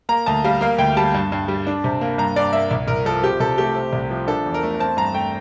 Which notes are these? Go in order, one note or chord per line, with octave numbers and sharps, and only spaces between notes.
A#3 A#5
D2 A5
G3 F5
A#3 F5
D2 G5
G3 A5
G2
G2
G3
D4
C3
A#3
G2 A#5
G2 D5
A#3 E5
C2
C2 A#4
F3 A4
C4 G4
C3 A4
A3 G4
C4
C2
F3
D4 A4
E2
A#4
A3
C4 A5
G2 A#5
A3 G5